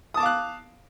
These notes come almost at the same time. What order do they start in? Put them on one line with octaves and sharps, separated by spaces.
D#6 A5 D6 F5 F#6